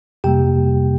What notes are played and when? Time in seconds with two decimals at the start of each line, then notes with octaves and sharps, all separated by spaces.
0.24 F2 C3 G3 A#3 G4 G5